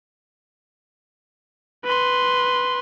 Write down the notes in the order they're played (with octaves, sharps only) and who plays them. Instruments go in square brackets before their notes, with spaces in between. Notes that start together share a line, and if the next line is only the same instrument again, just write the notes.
[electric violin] B4 C6